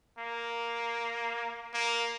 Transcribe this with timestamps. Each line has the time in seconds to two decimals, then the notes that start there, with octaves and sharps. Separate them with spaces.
0.18 A#3
1.73 A#3